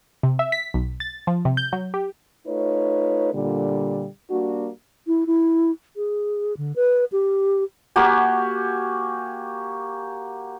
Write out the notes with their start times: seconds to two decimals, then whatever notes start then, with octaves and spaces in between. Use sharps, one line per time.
0.23 C3
0.39 E5
0.52 B6
0.74 B1
1.00 A6
1.27 F3
1.45 C3
1.57 G6
1.73 F#3
1.94 G4
2.47 A3 D#4 F4 B4 C#5
3.34 A#2 D3 G3
4.30 G3 A#3 D4 F#4
5.07 E4
5.27 E4
5.96 G#4
6.57 D3
6.76 B4
7.12 G4
7.96 A#3 F#4 G4 G#5